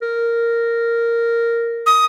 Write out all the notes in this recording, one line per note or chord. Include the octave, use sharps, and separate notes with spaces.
A#4
D#6